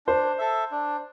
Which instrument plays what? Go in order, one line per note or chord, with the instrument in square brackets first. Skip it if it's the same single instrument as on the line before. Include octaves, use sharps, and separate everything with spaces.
[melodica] D4 [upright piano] C5
[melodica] A4 E5
D4